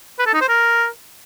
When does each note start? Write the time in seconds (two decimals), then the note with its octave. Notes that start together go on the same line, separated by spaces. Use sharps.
0.19 B4
0.26 A4
0.34 D#4
0.41 C5
0.49 A#4